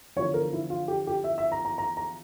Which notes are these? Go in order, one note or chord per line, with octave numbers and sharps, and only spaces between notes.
E2 D3 F3 C#5
A#4
E4
F4
G4
G4
E5
E5
A#5
A#5
A#5
A#5